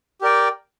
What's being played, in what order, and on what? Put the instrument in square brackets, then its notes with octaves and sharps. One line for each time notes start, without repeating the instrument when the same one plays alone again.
[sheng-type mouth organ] G4 A#4 D5 G5